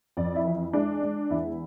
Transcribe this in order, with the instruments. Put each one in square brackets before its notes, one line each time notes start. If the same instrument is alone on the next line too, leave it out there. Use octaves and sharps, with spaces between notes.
[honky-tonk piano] F2 D5
E4
E3
E4
G#3 D4
G#3
E2 E4